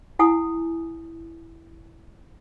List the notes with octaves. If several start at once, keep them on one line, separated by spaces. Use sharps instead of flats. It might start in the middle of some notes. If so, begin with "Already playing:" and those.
E4 F#5 G#5 D#6